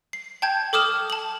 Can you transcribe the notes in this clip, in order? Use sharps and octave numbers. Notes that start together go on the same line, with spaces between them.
C7
G5 A5 G6 G#6
A4 D6 D#6 F6 E7
A5 F#7